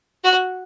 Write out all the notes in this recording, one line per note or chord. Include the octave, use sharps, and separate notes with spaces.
F#4